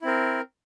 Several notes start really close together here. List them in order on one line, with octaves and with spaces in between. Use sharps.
E4 C4 A#4